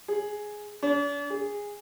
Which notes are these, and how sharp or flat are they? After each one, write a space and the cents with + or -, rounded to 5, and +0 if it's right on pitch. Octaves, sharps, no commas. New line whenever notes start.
G#4 +5
D4 -45
G#4 -15